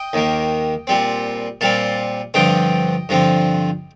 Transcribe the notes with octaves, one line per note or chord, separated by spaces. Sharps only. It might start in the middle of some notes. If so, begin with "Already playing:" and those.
Already playing: D#5 G5
D#2 D#3 A#3
A#2 G3 C4
A#2 G3 C4 F5 A5
G2 D3 F3 C4 D#5 G5
G2 D3 F3 C4